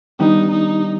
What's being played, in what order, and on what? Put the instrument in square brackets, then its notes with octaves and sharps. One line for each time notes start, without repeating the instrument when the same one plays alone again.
[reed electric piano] D#3 G3 B3 D4 G4 [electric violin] D#4
[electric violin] D#4